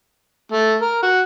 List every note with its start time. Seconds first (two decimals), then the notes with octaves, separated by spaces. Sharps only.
0.52 A3
0.82 A#4
1.03 F#4